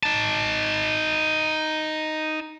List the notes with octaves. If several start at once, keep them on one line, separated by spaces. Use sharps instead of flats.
D#4 A5